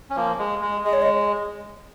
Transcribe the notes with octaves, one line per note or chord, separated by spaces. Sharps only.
C#4
F3 A#3
G#3
G#3
G#3 D#5
C#5
D#5